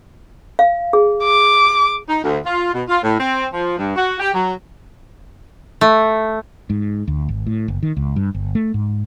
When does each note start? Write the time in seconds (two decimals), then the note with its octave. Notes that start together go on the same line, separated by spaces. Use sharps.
0.59 F5
0.93 G#4
1.23 D6
2.09 D#4
2.23 D2
2.45 F4
2.74 B2
2.88 F4
3.03 A2
3.20 C4
3.53 F3
3.77 G2
3.96 F#4
4.20 G4
4.34 F#3
5.81 A3
6.70 G#2
7.08 D2
7.29 G#1
7.46 A2
7.68 F#1
7.83 D#3
7.97 C#2
8.16 G2
8.34 G1
8.55 A3
8.74 G#2